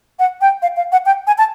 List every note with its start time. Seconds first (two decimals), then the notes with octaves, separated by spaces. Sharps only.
0.19 F#5
0.41 G5
0.62 F5
0.77 F5
0.92 F#5
1.06 G5
1.27 G#5
1.38 A5